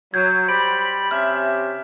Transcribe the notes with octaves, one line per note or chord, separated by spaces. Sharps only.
F#3 G6 G#6
G3 C5 B5 D7
C3 C#4 E5 F6